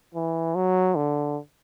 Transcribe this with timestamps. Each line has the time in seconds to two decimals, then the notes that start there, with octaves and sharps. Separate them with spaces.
0.15 E3
0.55 F#3
0.96 D3